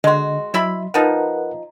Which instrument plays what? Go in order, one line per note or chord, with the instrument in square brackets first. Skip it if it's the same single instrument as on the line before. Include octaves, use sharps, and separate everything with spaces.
[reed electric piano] D3 [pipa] G#3 F#4 [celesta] D#5 C6
[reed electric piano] F#3 [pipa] E4 E5 B5
[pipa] F3 D#4 [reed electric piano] A#4 B4 F#5